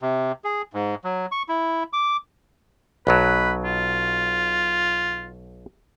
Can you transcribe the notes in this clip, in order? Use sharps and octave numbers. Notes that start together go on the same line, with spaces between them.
C3
G#4
G#2
F#3
C#6
E4
D6
B1 B2 F#3 B4
F4